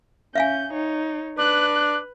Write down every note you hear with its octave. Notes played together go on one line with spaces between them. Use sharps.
C#4 E5 F5 G#5 G6
D#4 C#5
D4 B4 F#6